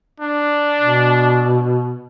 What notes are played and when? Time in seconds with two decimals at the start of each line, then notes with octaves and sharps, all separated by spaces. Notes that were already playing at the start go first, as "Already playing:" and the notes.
0.20 D4
0.79 B2